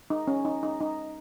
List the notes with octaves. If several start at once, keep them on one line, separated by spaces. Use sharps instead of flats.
D#4
C#4
D#4
D#4
D#4